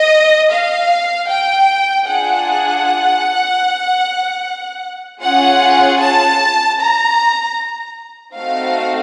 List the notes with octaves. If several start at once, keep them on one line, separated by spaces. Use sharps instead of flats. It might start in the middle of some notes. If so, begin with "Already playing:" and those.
Already playing: D#5
F5
G5
D4 F4 G#4 F#5
C#4 F4 G#4 F#5
A5
A#5
A3 C4 D#4 F#4 F5